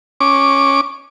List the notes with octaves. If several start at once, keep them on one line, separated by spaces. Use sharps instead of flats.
C#4 D6